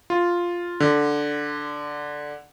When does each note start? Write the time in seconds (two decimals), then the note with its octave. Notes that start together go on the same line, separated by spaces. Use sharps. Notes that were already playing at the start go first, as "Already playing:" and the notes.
0.10 F4
0.80 D3